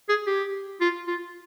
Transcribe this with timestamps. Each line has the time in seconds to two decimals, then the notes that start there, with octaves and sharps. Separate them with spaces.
0.09 G#4
0.27 G4
0.81 F4
1.08 F4